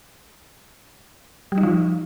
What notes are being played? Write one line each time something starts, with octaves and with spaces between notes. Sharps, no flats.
G3
D#4
F3